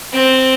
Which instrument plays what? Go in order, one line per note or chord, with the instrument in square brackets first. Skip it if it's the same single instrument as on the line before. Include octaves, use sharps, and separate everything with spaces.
[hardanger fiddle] C4